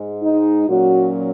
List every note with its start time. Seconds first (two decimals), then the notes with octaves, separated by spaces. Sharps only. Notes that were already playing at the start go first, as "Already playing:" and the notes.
Already playing: G#2 G#3
0.22 D#4
0.68 A#2 F#3 C#4 F#4